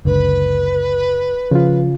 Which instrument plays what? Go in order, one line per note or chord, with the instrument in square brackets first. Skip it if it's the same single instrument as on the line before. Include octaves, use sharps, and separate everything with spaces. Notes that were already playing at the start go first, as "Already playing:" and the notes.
[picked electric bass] F#1 C#2 D3 [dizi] B4
[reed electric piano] C#3 F4 [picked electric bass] F3